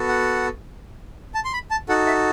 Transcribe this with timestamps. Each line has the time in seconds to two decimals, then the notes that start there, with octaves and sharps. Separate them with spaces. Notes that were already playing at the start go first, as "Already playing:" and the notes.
Already playing: B3 F#4 A4
0.08 F#5
1.34 A5
1.45 C6
1.53 B5
1.71 A5
1.89 D#4 F#4 A4 F#5
2.06 E5